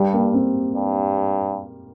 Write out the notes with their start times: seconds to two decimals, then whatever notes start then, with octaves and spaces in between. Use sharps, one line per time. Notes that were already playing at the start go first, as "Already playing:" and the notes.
Already playing: G2 G3
0.13 A#3
0.34 C4
0.76 G2